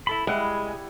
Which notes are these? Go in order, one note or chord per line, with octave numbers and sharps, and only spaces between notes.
E4 A4 B5
G3 G#3 E4 G#4 F#5